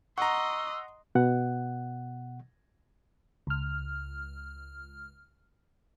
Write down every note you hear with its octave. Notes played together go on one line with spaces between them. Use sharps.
D#5 F#5 A#5 C6 C#6 E6
B2 F#5
C#2 F6